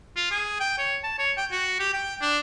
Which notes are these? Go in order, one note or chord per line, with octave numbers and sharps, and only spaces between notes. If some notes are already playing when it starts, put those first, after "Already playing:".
F4
G#4
G5
C#5
A5
C#5
G5
F#4
G4
G5
D4